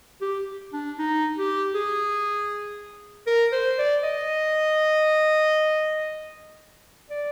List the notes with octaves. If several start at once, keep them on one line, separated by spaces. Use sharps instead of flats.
G4
D4
D#4
G4
G#4
A#4
C5
D5
D#5
D5